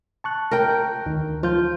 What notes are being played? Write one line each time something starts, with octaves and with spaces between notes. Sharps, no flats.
A5 C#6 F#6
A#4 G5
D2 D#3
F3 F4 G6